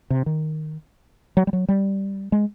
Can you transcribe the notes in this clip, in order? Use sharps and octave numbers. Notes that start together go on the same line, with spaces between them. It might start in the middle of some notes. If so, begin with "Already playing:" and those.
C3
D#3
F#3
G3
F#3
G3
G#3